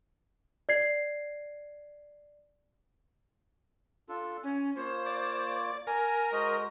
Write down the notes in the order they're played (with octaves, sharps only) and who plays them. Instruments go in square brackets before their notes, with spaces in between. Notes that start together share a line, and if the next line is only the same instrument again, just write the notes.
[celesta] D5 G#6 C7
[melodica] D4 F4 A4
[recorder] C#4 [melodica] G#5
[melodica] A#3 F4 C#5 [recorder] C5
[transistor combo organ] D5
[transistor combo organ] A#4 [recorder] G#5
[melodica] G#3 F#4 C5 [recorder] D#5